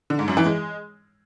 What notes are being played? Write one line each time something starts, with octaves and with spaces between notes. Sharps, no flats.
D3
G#2
F#2
E3
G#3